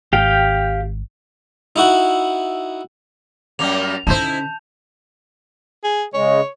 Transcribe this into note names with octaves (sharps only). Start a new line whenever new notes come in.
G#1 G4 F5 G5
D#4 E4 F#4
F#2 G3 A#3 F7
D3 C#4 D#4 E4 C5 A5 G6
G#4
C#3 G#3 C#5